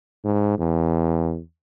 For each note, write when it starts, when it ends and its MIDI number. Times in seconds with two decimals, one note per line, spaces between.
0.25 0.57 44
0.59 1.40 40